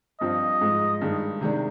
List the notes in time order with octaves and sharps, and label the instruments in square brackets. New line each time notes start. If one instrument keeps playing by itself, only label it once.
[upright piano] G2 F3 C4 F4 [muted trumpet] D#5
[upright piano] G#2 F3 G#3
G2 D#3 G#3
C3 D#3 G#3 D4